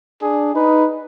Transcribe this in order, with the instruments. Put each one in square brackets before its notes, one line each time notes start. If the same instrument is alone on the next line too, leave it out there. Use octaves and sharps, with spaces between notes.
[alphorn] D4 [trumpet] G#4
[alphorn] D#4 [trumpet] B4